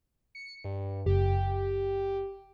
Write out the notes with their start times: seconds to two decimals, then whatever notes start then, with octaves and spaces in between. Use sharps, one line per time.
0.35 C#7
0.64 G2
1.06 F#1 G4